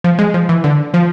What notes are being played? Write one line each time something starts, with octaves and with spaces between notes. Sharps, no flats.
F3
G#3
F3
E3
D3
F3